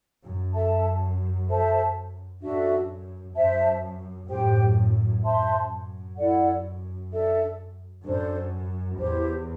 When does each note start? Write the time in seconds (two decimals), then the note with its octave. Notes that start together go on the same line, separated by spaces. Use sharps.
0.23 F#2
0.54 A4 E5 A5
1.48 A4 C5 E5 A5
2.41 F#2 D4 F#4 A4 E5
3.36 F#2 C5 E5 A5
4.29 F#2 A2 G4 C5 G5
5.22 F#2 C5 E5 A5 C6
5.69 F#2
6.16 E4 A4 D5 F#5
7.10 D4 A4 E5
8.04 F#2 D4 A4 C5
8.98 E2 E4 G4 C5